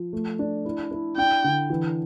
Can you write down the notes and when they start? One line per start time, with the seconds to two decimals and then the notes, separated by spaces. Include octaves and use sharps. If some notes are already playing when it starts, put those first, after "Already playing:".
Already playing: F3
0.13 A3
0.39 D4
0.65 E4
0.91 E4
1.17 D4 G5
1.44 D3
1.70 E3